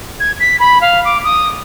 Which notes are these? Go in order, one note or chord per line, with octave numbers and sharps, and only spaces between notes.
G#6
B6
B5
F5
D6
D#6